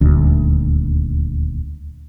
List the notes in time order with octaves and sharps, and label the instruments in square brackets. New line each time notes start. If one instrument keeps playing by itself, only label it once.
[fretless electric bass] D#1 D2